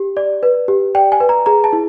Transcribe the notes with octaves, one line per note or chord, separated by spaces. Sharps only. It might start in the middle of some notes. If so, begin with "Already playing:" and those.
Already playing: G4
D5
B4
G4
D5 G5
G#5
B4
A#5
G#4 A#5
A5
E4